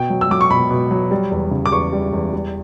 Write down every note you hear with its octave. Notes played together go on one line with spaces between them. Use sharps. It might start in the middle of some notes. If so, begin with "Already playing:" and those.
Already playing: B2 G5
F#3
E6
F#3 D6
C#6
B2 B5
B2
F#3
G3
E2
C#3
D6
E2 C#6
G3
E2
G3